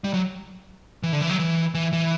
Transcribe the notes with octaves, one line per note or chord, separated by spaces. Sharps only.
G3
F#3
E3
D3
E3
F#3
E3
E3
E3